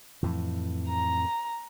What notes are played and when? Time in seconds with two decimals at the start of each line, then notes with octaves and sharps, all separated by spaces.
0.23 F2 A2 E3
0.89 A#5